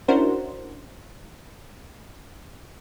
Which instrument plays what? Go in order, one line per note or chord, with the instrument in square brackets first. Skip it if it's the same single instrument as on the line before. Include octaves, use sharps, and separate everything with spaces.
[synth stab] C#4 D4 E4 F#4 A#4 C5